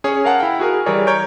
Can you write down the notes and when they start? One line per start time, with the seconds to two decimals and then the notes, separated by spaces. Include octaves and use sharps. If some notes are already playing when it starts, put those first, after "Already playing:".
0.04 C#4 G#4 C#5
0.24 A#4 F5 F#5 A5
0.40 E4 G5
0.60 F#4 G#4 A#4
0.86 E3 G3 G#4 A#4 C#5 D5
1.07 C#5 A#5 C#6 G6 D7